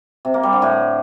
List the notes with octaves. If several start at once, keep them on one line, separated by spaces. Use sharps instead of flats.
C3
A#3
G3
D3
A2